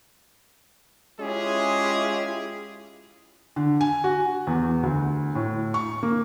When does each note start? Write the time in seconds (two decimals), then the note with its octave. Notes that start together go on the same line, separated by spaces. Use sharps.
1.20 G#3 C#4 E4 F4 G4 G#4
3.56 D3
3.81 G#5
4.04 F#4
4.47 E2
4.83 D2
5.35 A2
5.74 C#6
6.03 A#3